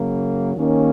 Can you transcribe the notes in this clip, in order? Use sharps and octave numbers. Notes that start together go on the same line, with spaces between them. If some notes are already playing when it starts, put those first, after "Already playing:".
Already playing: F#2 C#3 F#3 A#3
D#2 D#3 A#3 C#4